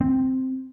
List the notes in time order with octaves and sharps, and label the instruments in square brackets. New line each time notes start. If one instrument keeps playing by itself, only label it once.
[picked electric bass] C4